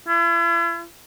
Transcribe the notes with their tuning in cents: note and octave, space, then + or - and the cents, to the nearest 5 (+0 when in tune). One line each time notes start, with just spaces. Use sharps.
E4 +45